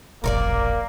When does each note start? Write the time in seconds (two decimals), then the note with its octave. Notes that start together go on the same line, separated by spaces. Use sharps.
0.24 E1 A#1 F#2 A#3 A#4 C#5 D5